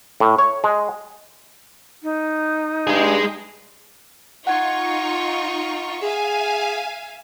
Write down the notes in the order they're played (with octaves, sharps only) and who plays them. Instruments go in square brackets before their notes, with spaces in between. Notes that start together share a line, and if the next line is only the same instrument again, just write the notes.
[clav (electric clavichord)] A2
C#5
G#3
[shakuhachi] D#4
[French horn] G2 [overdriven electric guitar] G#3 G#4
[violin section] D#4 F4 C#6 [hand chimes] F#5 G#6
[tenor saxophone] G#4 [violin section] E5 F5 G#5